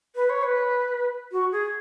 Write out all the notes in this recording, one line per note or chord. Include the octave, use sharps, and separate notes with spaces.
B4
C#5
B4
F#4
G#4